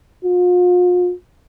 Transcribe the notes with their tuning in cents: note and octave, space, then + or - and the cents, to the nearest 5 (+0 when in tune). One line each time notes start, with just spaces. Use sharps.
F4 +40